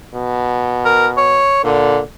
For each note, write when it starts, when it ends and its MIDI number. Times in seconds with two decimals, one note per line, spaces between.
0.15 1.48 47
0.85 1.07 70
1.17 1.64 73
1.64 2.01 46
1.64 2.00 50